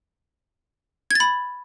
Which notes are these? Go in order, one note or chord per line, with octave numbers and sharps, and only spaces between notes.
B5 G#6 A6